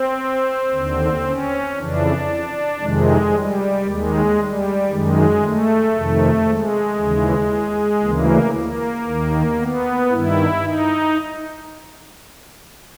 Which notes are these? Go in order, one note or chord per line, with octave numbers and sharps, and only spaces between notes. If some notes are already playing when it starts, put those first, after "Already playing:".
Already playing: C4
D#2 D3
C#4
F2 C#3 E3 D4
F2 C3 D#3 G#3
G3
D#2 D#3 G#3
G3
F#2 D#3 G#3
A3
F2 C3 D#3
G#3
D#2 C#3 E3
D2 C#3 E3 A#3
A#3
D#2 D#3
B3
G2 D#3 E4
D#4